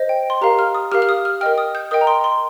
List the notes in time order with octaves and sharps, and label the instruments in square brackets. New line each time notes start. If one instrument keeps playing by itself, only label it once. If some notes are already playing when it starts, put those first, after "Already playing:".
Already playing: [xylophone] C5 D#5
G5
C6
G4 A#4 F5 A#5
F6
D#6
G4 A#4 F5 F6
F6
D#6
F6
A#4 D#5 G5 F6
D#6
G6
A#4 D#5 G5 D#6
A#5
C6
C6